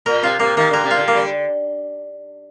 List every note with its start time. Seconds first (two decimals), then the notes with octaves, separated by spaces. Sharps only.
0.06 A#2 A#4
0.23 C3 F4
0.40 C3 A#3
0.57 D#3 A#3
0.71 D3 A#4
0.84 C3
0.91 F4
0.97 D3
1.08 A#3
1.16 G3